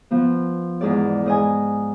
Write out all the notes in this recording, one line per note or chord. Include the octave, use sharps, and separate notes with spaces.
F3 B3
E2 G#2 D5
G#2 D#5 G#5